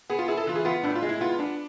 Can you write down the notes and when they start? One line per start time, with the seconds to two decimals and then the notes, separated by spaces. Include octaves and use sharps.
0.10 B3 G#4
0.19 F4
0.28 E4 G#4
0.37 A4
0.47 E3 F4
0.55 G#4
0.65 B3 F4
0.83 A2 D4
0.95 F4
1.02 G#3
1.09 E4
1.20 B3 F4
1.39 B3 D4